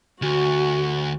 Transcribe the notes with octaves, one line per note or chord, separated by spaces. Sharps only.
D2 F#4